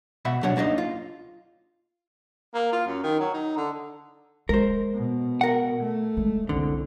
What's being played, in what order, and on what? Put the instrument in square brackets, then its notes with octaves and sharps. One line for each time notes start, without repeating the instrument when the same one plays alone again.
[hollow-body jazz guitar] B2 E5 F#5 B5
F#3 D4 C#5 F#5
C#2 A#3 D4 D#4 D#5
F4
[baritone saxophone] A#3
F4
F#2
D#3
F#3
D#4
D3
[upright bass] G#3 [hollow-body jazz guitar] A#4 C5
[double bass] B2
[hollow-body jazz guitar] A#4 F#5
[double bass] A3
[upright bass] G#3
[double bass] C2 [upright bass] F2 [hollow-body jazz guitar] D3